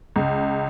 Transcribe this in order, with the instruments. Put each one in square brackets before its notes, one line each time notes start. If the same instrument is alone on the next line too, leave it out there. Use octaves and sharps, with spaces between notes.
[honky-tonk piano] C#2